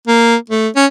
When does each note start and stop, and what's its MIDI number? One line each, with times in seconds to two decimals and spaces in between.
0.07 0.36 58
0.50 0.69 57
0.76 0.86 61